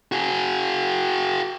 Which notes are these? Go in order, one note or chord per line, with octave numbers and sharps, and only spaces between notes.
F#4 G#4